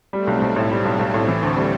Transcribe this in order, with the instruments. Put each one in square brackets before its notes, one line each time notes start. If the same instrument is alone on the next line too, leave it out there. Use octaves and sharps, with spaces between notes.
[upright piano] G3 [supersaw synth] A3 C4
[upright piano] B1
B1
A2
G3
B1
B1
A2
[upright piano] E3 [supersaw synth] A3 C4
[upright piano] D2
G3